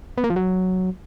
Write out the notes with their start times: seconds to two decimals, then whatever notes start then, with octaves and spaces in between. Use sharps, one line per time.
0.18 B3
0.24 A#3
0.30 F3
0.36 F#3